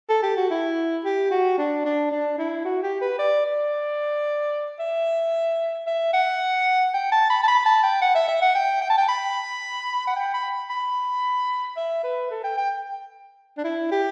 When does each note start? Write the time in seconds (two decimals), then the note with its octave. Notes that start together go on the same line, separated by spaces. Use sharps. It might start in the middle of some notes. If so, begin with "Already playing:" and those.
0.10 A4
0.23 G4
0.37 F#4
0.50 E4
1.04 G4
1.31 F#4
1.58 D4
1.85 D4
2.11 D4
2.38 E4
2.65 F#4
2.83 G4
3.01 B4
3.19 D5
3.46 D5
4.79 E5
5.87 E5
6.13 F#5
6.94 G5
7.12 A5
7.30 B5
7.43 A5
7.48 B5
7.66 A5
7.83 G5
8.01 F#5
8.15 E5
8.28 E5
8.42 F#5
8.55 G5
8.81 G5
8.90 A5
8.98 G5
9.08 B5
10.07 F#5
10.16 G5
10.34 B5
10.70 B5
11.77 E5
12.03 B4
12.30 A4
12.44 G5
12.57 G5
13.57 D4
13.64 E4
13.91 G4